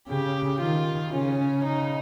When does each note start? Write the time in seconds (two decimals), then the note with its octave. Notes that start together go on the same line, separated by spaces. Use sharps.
0.09 C#3 G4
0.60 D#3 F4
1.12 C#3 C#4
1.64 D#4